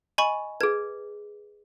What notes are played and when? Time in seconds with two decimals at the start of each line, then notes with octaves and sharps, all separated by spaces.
0.18 D#5 G#5 B5 C#6
0.61 G#4 B4 G#6